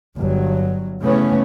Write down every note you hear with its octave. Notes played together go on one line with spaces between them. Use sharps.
G1 G2 F#3
C#3 E3 A3 B3 C#4